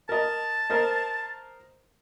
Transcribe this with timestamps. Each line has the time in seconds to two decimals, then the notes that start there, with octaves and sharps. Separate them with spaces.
0.09 A#4 D#5 A5
0.70 A#4 C5 D#5